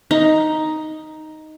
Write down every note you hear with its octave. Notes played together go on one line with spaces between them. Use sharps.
D#4